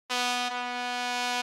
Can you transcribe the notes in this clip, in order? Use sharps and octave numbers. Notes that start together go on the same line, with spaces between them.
B3
B3